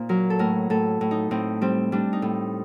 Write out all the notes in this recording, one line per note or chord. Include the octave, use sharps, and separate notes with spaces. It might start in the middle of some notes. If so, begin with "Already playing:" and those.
Already playing: A#2 A#3 D#4 C5
F#3 A#4
A4
A2 A#4
A2 A4
A2
D#4
A2 C4
G3 C4
G3 D4
D#4
A2